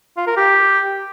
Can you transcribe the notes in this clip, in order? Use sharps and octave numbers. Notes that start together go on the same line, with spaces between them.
F4
A#4
G4